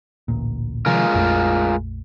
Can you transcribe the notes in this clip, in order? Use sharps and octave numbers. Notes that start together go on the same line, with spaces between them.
A1 D2 A#2
C3 D#3 F3 G#3 F4 A#4
A#1 F2 A3